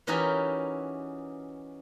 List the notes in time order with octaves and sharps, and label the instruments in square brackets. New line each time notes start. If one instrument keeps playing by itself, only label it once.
[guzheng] E3 C#4 D#4 F#4 G4 A#4